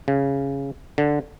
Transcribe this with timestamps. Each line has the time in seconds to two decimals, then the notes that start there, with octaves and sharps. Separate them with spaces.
0.08 C#3
0.98 D3